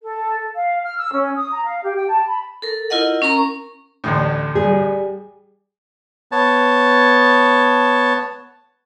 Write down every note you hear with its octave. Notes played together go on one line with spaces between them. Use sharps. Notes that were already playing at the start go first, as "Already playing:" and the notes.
A4
F5
F6
E6
C#4
D#6
A#5
F5
G4
G5
A5
B5
A4 A#4
E4 F4 A#4 D#5 F#5
C#4 A#4 A#5 C#6
A1 D2 A2
G3 G#4
B3 C#5 A5